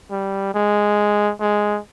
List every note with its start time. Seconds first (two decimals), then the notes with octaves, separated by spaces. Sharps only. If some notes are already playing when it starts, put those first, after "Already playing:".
0.11 G3
0.54 G#3
1.41 G#3